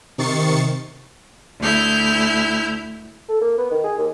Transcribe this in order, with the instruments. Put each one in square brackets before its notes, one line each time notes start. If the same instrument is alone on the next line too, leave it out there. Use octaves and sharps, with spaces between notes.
[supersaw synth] C3 D#3 C#6 A6 C7 C#7
[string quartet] D2 E4 F6 G6
[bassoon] A4
A#3
B3
D#3
G#4
D#2